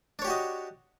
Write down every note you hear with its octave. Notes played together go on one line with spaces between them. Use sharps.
D4 F#4 G4 C#5 D#5